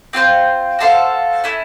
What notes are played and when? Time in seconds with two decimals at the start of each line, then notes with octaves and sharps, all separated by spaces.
0.13 C4 F4 A4 C5
0.79 F#4 A4 C5 F5
1.44 A3 C#4 E4